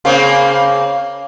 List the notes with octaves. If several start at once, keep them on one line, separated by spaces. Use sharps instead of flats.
C#3 A#3 C4